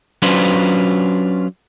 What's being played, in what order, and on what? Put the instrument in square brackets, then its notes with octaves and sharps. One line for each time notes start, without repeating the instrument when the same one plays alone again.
[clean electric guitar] F#3 C#4 D4 F4 B4 C5